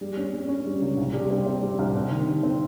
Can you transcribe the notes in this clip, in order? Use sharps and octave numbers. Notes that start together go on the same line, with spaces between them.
G3
C#4
C#4
C#4
G3
C#2
C2
G3
C4
C4
G3
C2
C4
D#3
D#3
C4